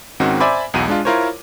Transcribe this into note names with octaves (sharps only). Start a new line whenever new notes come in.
G#2 D#3 C4 C#4 F#4
C5 D5 E5 G#5 B5 D6
B1 E2 F#4 D#7
G#3 D4 F4
E4 F4 A#4 C5 C#5